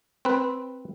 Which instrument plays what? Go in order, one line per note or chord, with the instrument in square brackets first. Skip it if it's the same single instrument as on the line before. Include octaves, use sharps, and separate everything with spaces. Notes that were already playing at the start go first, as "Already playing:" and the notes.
[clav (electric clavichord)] C4 B4